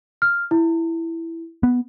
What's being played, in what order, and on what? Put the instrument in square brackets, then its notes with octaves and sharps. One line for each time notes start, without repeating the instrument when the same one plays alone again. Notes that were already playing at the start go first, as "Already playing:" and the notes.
[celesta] F6
E4
[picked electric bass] B3